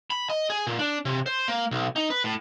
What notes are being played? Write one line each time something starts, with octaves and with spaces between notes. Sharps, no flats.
B5
D#5
G#4
A#2
D4
C3
C5
A#3
B1
D#4
B4
A2